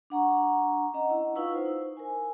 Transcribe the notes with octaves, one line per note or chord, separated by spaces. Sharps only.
D4 F#5 A#5 C#6
C#4 D#5 F#5 A#5
E4
D#4 F4 B4 F5 C#6 E6
C5
A#4 G#5